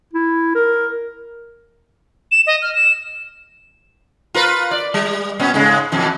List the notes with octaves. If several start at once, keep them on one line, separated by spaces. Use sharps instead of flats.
E4
A#4
E7
D#5
F6
E7
F4 A#4 B4
D5
G3
A#2 B3 C#4
G#2 C#3 G#3
F2 B2 E3